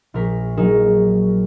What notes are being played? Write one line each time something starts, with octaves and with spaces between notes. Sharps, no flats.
A#1 A#4 B6
F#3 A#3 D#4 G#4 A#4 E7